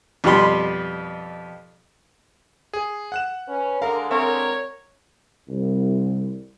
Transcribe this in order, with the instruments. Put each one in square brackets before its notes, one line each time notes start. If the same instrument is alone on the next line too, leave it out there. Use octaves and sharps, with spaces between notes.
[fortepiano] F2 B2 G3 G4 B5 C6
[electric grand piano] G#4
F#5 F#6 E7
[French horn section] C#4 B4
[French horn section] D3 G#3 [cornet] A#4 [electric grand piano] F5
[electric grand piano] C4 E5 [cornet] A#4 [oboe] C#5
[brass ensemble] C2